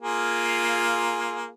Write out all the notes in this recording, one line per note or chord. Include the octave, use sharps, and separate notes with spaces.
A#3 F4 G#4